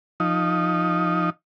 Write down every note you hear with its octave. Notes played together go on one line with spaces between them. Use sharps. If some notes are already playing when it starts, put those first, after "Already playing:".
F3 D#4